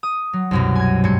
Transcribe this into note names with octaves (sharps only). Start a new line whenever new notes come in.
D#6
F#3
C2 F#2 B2
G#5 G#6
G2 G3 G#3 G#6 C#7